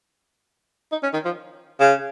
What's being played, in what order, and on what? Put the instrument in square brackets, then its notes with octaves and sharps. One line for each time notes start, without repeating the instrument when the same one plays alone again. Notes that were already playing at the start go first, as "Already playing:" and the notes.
[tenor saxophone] D#4
C#4
D#3
F3
C#3